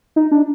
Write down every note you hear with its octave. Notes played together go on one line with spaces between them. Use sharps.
D#4
D4